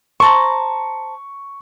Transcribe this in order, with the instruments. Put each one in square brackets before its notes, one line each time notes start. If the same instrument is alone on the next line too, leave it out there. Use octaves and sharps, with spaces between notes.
[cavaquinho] C5 A5 A#5 [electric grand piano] C#6